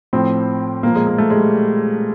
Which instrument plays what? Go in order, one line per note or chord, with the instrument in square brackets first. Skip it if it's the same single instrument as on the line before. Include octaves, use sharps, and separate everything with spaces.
[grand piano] A2 F3 C4
A#2 F3 A#3
G#3
A#3
A3
G#3
G3